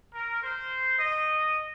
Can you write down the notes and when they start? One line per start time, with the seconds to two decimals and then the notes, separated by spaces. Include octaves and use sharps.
0.14 A#4
0.42 C5
0.98 D#5